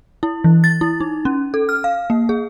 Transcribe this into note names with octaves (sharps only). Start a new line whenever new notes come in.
E4
E3
A6
E4
D#4
C#4
A4
F6
F5
A#3
G#4